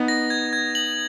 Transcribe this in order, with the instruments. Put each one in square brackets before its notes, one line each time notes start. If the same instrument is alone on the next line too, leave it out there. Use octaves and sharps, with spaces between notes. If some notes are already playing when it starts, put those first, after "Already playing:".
Already playing: [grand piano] B3 D#4
[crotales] A#6
G#6
G#6
F#7